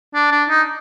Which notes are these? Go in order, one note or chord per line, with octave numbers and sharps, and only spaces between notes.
D4
D4
D#4